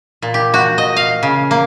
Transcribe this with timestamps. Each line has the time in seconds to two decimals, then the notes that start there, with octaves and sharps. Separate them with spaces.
0.22 A#2
0.34 G4
0.54 F#4
0.78 D#5
0.96 F5
1.23 C#3
1.51 A#3